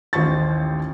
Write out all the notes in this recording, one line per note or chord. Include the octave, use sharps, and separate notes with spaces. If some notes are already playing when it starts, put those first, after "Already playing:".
A1 D#2 F4 C5 C#6 A6